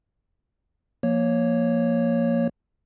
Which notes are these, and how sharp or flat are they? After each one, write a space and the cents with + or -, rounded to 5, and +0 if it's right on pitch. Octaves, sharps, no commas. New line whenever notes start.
F3 -10 A#3 +0 C#5 +0